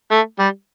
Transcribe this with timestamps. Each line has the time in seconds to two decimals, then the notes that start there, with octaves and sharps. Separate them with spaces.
0.11 A3
0.39 G3